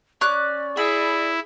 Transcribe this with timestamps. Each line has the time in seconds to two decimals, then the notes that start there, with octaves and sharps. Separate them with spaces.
0.21 C#4 D5 D6 F#6
0.77 E4 G#4 B5